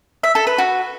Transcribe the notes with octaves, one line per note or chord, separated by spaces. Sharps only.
E5
A4
B4
F#4